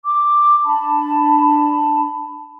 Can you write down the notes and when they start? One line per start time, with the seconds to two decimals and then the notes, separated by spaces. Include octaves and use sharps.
0.05 D6
0.65 D4 A5 B5